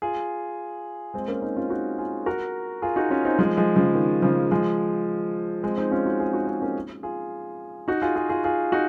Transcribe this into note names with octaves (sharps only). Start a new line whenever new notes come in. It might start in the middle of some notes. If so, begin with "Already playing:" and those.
F4 G#4
G#3 C4
A#3 C#4
C4 D#4
C#4 F4
D#4 F#4
F4 G#4
F#4 A#4
F4 G#4
D#4 F#4
C#4 F4
C4 D#4
F3 G#3
F3 G#3
C#3 F3
D#3
C#3 F3
F3 G#3
G#3 C4
C4 D#4
C#4 F4
D#4 F#4
F4 G#4
D#4 F#4
C4 D#4
A#3 C#4
F4 G#4
D#4 F#4
F4 G#4
F4 G#4
F4 G#4
F4 G#4
D#4 F#4